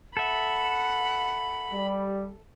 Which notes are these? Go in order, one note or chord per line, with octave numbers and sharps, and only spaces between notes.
A4 E5 F#5 B5
G3